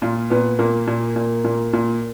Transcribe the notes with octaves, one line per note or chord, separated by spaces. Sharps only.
A#2 F4
A#2 B3
A#2 A#3
A#2
A#2
A#2
A#2